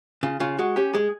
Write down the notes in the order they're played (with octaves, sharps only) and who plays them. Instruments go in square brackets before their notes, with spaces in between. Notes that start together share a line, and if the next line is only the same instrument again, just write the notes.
[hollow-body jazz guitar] C#3 [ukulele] F4
[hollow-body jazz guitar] C#3 [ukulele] F4
[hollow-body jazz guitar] G#3 [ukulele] F#4
[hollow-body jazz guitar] C#4 [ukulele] G4
[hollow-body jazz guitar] G#3 [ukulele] G#4